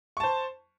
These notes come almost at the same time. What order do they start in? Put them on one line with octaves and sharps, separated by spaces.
C#6 A5 C5